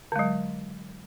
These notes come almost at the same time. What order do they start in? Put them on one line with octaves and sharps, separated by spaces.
D3 G#3 F#3